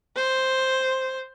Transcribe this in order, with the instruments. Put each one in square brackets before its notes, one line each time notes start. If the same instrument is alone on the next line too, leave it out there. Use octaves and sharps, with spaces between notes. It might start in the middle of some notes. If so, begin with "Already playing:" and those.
[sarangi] C5